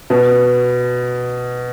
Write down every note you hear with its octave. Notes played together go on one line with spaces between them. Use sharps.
B2